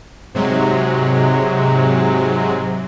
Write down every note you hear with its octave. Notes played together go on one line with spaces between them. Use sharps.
G#2 C3 F#3 G#3